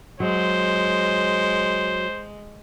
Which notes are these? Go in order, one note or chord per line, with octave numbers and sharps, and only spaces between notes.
F#3 G#3 C5